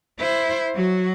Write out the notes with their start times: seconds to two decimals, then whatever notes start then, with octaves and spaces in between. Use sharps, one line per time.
0.19 E4 C5
0.75 F#3 F#4